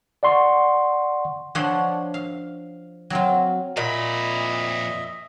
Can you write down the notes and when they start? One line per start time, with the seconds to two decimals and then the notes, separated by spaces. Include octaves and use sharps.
0.23 D5 F#5 C6 C#6
1.55 F3 D4 C#5 F#5 C6
2.14 F5
3.10 F#3 C4 F4
3.77 F2 A#2 D#5 E5 B5